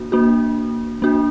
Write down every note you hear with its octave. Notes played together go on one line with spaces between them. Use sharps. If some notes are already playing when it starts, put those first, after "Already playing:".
Already playing: A#3 D4 F#4
A#3 D4 F#4
A#3 D4 F#4